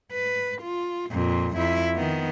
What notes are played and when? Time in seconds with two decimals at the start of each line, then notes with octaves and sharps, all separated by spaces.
0.12 B4
0.62 F4
1.10 F2 A#2
1.56 F2 E4
1.95 D#3 B3